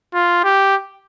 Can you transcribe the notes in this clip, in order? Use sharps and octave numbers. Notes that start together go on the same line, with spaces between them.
F4
G4